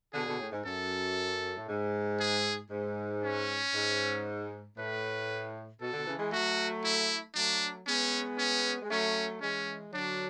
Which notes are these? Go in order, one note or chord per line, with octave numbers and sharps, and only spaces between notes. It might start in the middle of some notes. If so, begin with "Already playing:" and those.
B2 D3 G#4
B2 D3
A2
G#2
F#2 A4
A2
G#2
G#4
G#2
C#4
G#2
A2 B4
B2 A4
B2 D3
C#3 E3
E3 G#3
F#3 A3 F#4
E4
F#3 A3 D4
G#3 B3 C#4
C#4
G#3
F#3 A3 C#4
E3 G#3 C#4
D3 F#3 D4